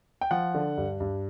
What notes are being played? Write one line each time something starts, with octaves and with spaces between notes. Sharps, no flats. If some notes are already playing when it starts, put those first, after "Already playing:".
G5
F3 F#5
D3
G2
G2